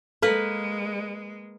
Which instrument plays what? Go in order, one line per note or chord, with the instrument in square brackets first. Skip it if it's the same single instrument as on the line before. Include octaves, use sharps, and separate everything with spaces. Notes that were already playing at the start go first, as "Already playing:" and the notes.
[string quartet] G#3 [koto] A#3 B4 [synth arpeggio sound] A4